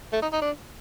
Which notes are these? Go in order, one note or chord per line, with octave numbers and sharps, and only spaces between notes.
A3
D#4
D#4
D4